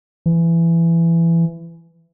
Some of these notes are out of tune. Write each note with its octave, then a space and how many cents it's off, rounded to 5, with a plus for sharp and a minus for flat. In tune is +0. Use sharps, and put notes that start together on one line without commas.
E3 +20